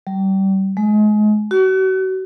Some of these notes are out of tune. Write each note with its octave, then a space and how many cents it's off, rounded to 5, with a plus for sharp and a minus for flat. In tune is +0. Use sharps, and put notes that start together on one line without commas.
G3 -25
G#3 +30
F#4 +40